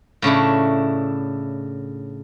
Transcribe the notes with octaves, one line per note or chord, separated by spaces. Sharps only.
A2 C#3 D4 E4